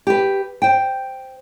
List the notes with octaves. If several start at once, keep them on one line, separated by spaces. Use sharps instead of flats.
G4 B4
C5 G5